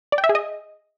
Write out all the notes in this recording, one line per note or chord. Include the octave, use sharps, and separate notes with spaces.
D5
G5
E5
G#4
D#5